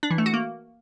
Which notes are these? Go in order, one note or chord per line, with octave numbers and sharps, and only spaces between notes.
D4
E3
A3
F#4
A#3